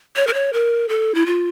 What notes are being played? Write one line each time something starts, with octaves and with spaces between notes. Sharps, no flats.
C#5
A#4
C#5
A#4
A4
E4
F4